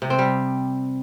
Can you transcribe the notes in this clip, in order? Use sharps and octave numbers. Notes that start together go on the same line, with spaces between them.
C3
C4
G3